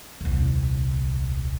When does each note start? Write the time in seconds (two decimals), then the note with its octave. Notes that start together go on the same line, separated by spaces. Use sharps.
0.21 D#1 C2